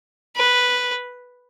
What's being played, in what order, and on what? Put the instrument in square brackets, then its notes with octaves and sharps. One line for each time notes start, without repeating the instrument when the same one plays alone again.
[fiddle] B4